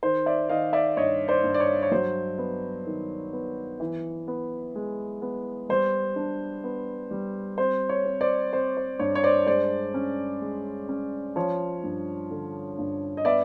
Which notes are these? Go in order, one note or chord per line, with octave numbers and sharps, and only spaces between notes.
D#3 C5
D5 E5
D#3 D#5 F5
D5 E5
G2 C#5 D#5
C5 D5
G2
D5
C#5
C#5
F#3 C5
B3
D#3
B3
E3
B3
G#3
B3
G3 C5
D4
B3
G3
C4 C5
C#5
C4
C5 D5
C4 C5
C5
G2 C#5
C#5
C5 D5
G#3 C5 D5
C#4
G#3
C#4
F3 C#5
G2
D3
G2
D#5
B3 D5 E5